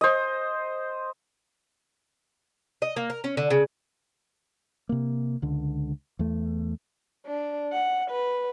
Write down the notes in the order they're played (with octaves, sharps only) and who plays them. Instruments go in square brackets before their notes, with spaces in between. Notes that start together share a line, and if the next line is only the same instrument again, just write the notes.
[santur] C5 D#5
[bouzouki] D#5
A#3
A#4
C#4
D3
C#3
[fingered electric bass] C3 A#3
C#2 D3
E2 A3
[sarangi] D4
F#5
B4